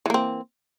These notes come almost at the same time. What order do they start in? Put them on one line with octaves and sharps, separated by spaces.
E3 A#3 C4